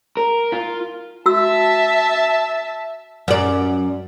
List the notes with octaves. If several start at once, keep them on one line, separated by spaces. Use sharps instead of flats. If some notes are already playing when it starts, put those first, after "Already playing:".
A#4
F4
F#4 E5 A5 E6
F#2 D5